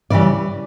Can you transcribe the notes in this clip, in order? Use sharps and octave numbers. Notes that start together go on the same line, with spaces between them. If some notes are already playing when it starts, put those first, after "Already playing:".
C#3 E3 G3 D5